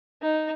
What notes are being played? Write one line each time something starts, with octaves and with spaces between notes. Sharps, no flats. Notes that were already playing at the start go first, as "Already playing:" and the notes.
D#4